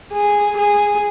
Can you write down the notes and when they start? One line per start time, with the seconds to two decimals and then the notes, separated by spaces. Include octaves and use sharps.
0.13 G#4
0.58 G#4